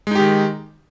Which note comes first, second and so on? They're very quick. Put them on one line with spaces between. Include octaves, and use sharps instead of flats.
G#3 D#4 G4 D#3